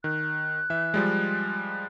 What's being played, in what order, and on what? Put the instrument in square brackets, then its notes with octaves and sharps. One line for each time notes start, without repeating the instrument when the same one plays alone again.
[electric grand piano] D#3 [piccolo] F#6
[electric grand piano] E3 E5
F3 G3 G#3